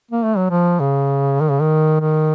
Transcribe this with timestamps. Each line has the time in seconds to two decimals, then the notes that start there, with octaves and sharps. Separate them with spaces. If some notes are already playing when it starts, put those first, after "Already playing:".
0.11 A#3
0.24 A3
0.37 F#3
0.51 F3
0.80 C#3
1.41 D#3
1.51 C#3
1.61 D#3
2.00 D#3